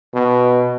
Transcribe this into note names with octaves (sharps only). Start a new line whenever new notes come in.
B2